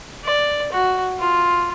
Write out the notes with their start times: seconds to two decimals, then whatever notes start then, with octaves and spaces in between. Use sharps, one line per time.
0.24 D5
0.72 F#4
1.19 F4